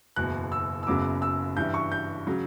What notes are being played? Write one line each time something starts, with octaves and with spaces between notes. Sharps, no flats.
F#1 E2 B2 F#6
E6
E6
F#1 F#2 C#3 F#3 B3 D6
E6
G2 E3 G3 G6
C#6
G6
C#3 F#3